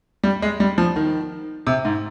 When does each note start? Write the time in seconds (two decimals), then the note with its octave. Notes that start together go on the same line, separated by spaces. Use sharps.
0.23 G3
0.42 G#3
0.60 G3
0.78 F3
0.96 D#3
1.67 C3
1.85 G#2